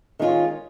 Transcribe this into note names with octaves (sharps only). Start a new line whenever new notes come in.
D#3 G#3 C#4 F4